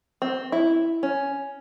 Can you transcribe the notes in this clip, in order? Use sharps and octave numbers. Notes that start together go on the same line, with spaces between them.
C4
E4
C#4